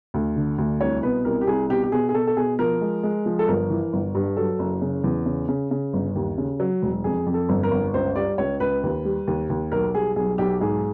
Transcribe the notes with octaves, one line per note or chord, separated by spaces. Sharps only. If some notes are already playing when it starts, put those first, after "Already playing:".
D2
D3
D2
C2 C#5
B2 B4
C2 A#4
G4
C2 G#4
B2 G4
G4
B2 G#4
G#4
B2 A4
A4
B2 G#4
F3 A#4
G#3
G#3
F3
A4
G1 A#4
E3
G1
G2
F#3 A4
F#1
C#3
E2
C#3
C#3
C#3
G1
D#2
C#3
F#3
E1
F2 G#4
F2
A4
G1
A#4
G1
C#2 C5
G3 D5
C#2 C#5
C#2 B4
D#2
G3
D#2
D#2
B1 A#4
G3 G#4
B1 G#4
B1 G4
G#2 G#4